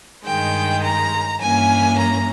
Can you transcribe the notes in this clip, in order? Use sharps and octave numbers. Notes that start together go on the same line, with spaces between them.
G2 D#3 G#3 G5
A#5
G2 E3 A#3 C#4 G#5
A#5